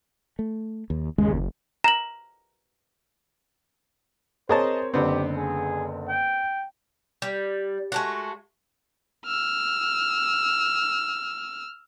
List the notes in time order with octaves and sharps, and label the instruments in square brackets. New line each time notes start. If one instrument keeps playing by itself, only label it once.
[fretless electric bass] A3
D#2
[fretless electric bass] G1 D#2 C#3 [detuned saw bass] G#3
[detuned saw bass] F#1
[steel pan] A#5 [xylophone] E7 F#7
[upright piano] C4 A#4 C#5 [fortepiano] G#4 D#5 A5 [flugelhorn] C5
[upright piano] F#1 D3 C5 [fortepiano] B3 C4 [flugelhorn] G4
[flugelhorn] G#4
G5
[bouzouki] G3
G#3 A3 F#4
[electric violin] E6 F6